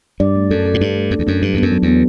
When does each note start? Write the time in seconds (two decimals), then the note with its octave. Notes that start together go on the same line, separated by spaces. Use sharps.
0.20 G2 D5
0.35 A3
0.50 F#2 A4
0.66 A4
0.74 A2
0.81 G2 D4
0.96 A3
1.11 F#2 D4
1.19 E2
1.27 F#2 D4
1.41 G2 F#3
1.54 E2 B3
1.62 F#2
1.72 F#3
1.82 E2 B3